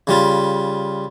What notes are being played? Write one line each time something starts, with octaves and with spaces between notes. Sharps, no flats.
C#3 G3 F4